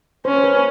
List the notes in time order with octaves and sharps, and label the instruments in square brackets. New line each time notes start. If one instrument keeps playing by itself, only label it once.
[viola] C#4 [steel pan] C5
[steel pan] C5
B4